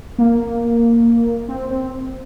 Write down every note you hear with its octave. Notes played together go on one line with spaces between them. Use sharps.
A#3
C4
C4